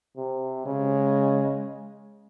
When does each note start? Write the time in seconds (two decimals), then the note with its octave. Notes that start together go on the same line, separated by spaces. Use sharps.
0.17 C3
0.66 C#3 G#3